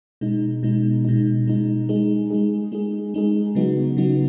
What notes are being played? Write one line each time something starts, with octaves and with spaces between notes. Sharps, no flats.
B2 G#3 D#4
B2 G#3 D#4
B2 G#3 D#4
B2 G#3 D#4
G#3 D#4 G#4
G#3 D#4 G#4
G#3 D#4 G#4
G#3 D#4 G#4
C#3 F#3 B3 D#4 F#4
C#3 F#3 B3 D#4 F#4